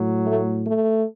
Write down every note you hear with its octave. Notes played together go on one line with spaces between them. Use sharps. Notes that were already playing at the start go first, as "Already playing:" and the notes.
Already playing: A2 F#3
A3
A3